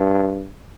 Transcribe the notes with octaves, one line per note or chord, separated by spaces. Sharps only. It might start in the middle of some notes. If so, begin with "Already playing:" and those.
Already playing: G2